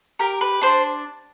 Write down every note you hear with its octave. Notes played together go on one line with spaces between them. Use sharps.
G4 A#4
B4
D4 C5